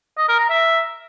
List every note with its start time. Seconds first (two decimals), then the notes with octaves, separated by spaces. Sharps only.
0.17 D#5
0.28 A#4
0.39 A#5
0.50 E5